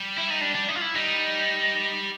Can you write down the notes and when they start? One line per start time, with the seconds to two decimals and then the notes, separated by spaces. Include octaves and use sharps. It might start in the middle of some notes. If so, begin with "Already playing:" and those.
Already playing: G3
0.18 E4
0.30 D#4
0.41 D4
0.55 D4
0.68 D#4
0.76 F4
0.81 E4
0.96 G3 D#4